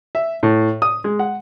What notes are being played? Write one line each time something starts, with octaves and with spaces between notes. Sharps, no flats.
E5
A2
D#6
G#3
F#5